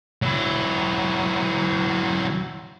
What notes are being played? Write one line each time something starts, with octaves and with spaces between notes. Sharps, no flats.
F#3 E4